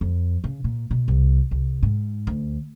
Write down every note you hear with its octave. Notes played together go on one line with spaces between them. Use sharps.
F2
C#3
A#2
B2
C2
C2
G#2
D2